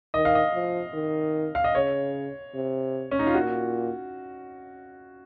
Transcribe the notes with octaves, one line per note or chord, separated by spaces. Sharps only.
D#3 D#5
F5
D#5
F3
D#3
F5
D#5
C#3 C#5
C3
C#4
D#4
F4
A#2 F#4